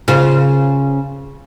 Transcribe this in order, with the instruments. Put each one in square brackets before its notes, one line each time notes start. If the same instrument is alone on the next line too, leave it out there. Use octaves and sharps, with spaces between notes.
[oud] C#3 F4 C5